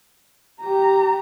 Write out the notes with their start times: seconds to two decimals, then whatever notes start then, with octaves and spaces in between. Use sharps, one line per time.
0.60 G4 A#5